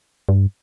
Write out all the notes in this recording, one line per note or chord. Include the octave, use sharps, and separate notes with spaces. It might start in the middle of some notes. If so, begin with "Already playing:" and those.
G2